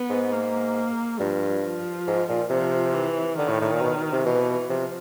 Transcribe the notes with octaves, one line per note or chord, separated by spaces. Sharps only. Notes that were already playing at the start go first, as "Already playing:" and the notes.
Already playing: B3
G#2
A#3
G2 F3
F3
G#2
A#2
C3 F3
E3
D3 D#3
A2
A2
A#2
B2
C3
B2 E3
C3 F3